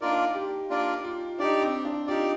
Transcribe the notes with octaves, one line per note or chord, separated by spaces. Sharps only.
A#3 D4 D#4 F4 A#4 D5
G4
A#3 D4 F4 A#4 D5
F4
D4 D#4 G4 D5
C4
D4
D#4 F4 G4 D5